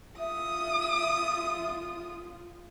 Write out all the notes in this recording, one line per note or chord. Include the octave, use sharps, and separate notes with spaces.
F4 E5 D#6